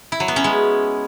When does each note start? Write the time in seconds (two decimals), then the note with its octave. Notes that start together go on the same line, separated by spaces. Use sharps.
0.12 E4
0.20 F#3
0.28 B3
0.36 C#4
0.44 G#3